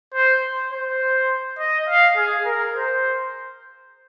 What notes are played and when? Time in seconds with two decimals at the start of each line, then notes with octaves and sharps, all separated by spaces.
0.14 C5
0.72 C5
1.59 D#5
1.88 F5
2.17 G#4
2.46 A#4
2.74 C5